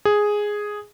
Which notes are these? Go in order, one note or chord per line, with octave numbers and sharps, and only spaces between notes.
G#4